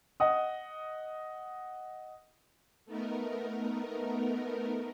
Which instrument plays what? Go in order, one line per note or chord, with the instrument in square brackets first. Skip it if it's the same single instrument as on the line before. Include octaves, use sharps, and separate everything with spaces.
[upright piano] D#5 F#5 D#6
[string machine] A3 B3 D#4 A#4